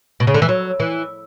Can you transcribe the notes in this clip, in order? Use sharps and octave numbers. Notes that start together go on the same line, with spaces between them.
B2
C#3
D3
E3
F#3
E3